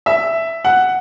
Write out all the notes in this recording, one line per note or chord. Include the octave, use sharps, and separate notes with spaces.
E5
F#5